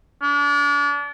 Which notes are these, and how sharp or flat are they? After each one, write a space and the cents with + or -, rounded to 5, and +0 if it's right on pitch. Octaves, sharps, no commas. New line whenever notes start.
D4 -35